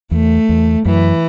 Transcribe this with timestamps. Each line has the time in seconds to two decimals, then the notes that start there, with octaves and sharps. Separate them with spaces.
0.11 E2 A3
0.49 E2
0.85 F#2 E3